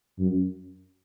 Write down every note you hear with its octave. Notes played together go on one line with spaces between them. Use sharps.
F#2